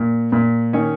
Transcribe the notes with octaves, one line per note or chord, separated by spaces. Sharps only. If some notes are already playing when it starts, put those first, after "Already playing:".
Already playing: A#2
A#2
D#3 C#4